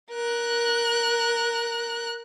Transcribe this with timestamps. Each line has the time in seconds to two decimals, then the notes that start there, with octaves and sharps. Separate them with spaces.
0.12 A#4 F#6